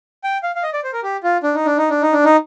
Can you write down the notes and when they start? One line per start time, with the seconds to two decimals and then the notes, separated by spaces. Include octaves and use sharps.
0.24 G5
0.43 F5
0.55 F5
0.63 D#5
0.73 D5
0.84 C5
0.93 A#4
1.03 G4
1.23 F4
1.43 D4
1.55 D#4
1.66 D4
1.78 D#4
1.90 D4
2.02 D#4
2.13 D4
2.25 D#4